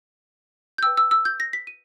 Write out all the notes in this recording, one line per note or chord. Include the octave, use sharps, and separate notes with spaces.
G6
B4 G5 E6
E6
E6
G6
A#6
B6
D#7